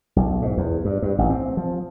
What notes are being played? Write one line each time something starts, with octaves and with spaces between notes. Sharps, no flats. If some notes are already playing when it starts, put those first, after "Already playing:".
B1
G#2
E2
G2
G2
A1
C4
F3